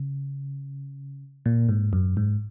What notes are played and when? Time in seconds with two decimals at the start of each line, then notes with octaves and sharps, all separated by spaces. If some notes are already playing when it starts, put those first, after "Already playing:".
Already playing: C#3
1.46 A#2
1.69 G#2
1.93 F#2
2.17 G#2